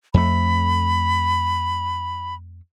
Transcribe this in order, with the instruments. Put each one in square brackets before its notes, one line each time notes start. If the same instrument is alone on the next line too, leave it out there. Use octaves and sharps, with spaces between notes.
[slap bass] F2 A3 [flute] B5